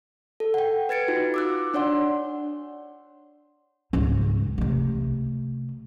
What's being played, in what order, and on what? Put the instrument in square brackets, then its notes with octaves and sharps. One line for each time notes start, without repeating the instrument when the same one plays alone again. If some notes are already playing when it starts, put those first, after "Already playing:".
[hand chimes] A4
F#5 G5
B4 G#6 A6 C#7 D7
D#4 F4 F#4
D6 E6 F#6
D4 C#5 D5 F#5 C6
[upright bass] C#2 G#2
C3 A3